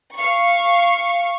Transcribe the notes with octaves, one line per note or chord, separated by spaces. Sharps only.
F5 C#6